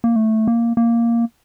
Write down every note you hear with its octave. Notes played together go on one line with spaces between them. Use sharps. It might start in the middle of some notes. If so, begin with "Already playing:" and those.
A#3
A3
A#3
A#3